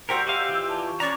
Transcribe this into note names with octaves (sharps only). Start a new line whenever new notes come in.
F#4 G4 A#4 C5 D5 E6 G6
F#4 G4 D#5 F5
E3 F4
D5 A5
C#6
C#4 D5 A#5 C#6